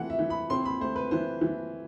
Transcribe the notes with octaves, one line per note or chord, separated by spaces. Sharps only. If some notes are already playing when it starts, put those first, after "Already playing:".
Already playing: E3 A3 C4 F#5
E5
E3
B5
C4 C6
B5
A3 C5
B4
E3 C5
E3